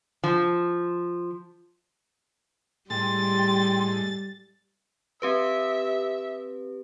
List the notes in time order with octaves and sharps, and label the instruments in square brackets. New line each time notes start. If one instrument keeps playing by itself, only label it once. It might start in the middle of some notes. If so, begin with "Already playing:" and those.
[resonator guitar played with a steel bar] F3
[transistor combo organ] A2 G#3 [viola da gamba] G3 [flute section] G5 C6 [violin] A6
[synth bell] C4 G4 B4 [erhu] E5